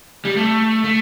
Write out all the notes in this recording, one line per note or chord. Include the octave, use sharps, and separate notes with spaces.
G3
A3
A3